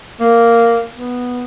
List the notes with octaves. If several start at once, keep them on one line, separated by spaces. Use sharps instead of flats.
A#3
B3